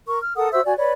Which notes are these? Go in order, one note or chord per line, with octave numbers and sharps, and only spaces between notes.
A#4 C#6
F6
A4 A#4 F#5 D#6
F#4 C5 E5 E6
F#4 D5 G#5
B4 C#5 D5